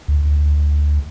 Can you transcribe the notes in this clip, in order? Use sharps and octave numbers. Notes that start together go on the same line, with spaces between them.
D2